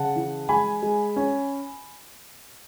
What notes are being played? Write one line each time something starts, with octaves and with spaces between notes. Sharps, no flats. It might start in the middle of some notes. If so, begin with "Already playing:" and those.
Already playing: C#3 F#5 A5
E3
G#3 G#5 B5
G#3
C#4